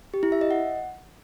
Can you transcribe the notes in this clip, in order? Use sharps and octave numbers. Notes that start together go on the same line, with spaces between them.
G4
E4
E5
D#5
F#5